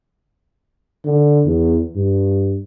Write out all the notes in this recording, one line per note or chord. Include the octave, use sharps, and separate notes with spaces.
D3
E2
G2